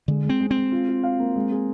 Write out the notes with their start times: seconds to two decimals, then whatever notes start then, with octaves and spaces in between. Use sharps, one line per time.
0.08 D3 G#3
0.24 G#3
0.29 C4
0.40 G#3
0.51 C4
0.56 G#3
0.72 F4
0.88 F4
1.03 F5
1.20 A#3
1.36 G#3
1.51 G#4